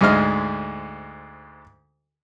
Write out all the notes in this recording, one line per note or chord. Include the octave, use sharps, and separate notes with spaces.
D2 G#2 G#3 D#5 F6